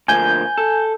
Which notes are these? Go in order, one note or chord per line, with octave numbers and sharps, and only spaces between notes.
D2 F3 A#3 G#5 G6
A4